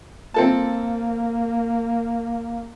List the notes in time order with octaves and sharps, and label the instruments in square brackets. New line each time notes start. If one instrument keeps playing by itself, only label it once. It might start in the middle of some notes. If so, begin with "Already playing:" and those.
[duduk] A#3 [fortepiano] C4 A4 A5